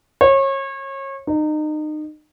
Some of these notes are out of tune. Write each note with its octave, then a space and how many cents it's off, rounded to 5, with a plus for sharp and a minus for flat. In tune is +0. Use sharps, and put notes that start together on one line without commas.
C#5 -30
D#4 -30